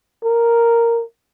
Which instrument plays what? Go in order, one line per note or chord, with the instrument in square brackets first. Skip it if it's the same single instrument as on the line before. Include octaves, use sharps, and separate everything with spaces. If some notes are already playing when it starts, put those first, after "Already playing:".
[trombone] A#4